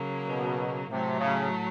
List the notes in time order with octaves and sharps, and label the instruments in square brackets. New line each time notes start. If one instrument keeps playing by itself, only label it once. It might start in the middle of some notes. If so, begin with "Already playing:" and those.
Already playing: [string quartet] C#3 F#3 A#3
[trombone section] B2
[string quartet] A2 F#3 A3 [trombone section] C3
[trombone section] C#3